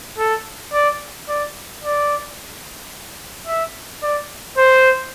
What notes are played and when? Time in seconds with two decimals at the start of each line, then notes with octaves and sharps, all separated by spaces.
0.19 A4
0.73 D5
1.28 D5
1.83 D5
3.48 E5
4.03 D5
4.58 C5